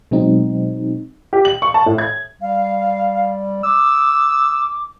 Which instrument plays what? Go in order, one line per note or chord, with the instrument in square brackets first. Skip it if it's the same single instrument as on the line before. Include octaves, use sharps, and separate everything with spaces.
[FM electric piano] B2 F#3 G#3 C4 D#4
[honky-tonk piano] G4
F#7
C#6
A5
A2
G#6
[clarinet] G3 [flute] F5
[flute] D6 [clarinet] E6